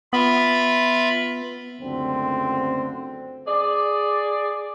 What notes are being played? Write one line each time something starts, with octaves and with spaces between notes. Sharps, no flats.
B3 F4 E5 B5
C#2 F#2 D3 A3 C4
G#4 D5